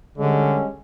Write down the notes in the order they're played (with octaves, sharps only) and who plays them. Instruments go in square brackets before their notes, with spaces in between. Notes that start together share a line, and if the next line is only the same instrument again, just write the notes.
[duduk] D3 [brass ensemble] G3 G#3 C#4